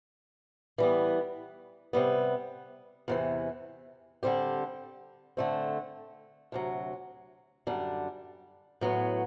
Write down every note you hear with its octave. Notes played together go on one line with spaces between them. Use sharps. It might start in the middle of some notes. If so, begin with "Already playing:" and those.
E3 G3 B3
C3 G3 B3
E2 C3 E3
D3 G3 C4 G4
D3 A3 C4
D2 C3 F#3
F#2 D3 G3 D4
A2 F#3 B3